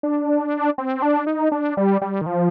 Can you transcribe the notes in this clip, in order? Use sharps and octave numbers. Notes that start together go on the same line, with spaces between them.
D4
C4
D4
D#4
D4
G3
G3
D#3
F3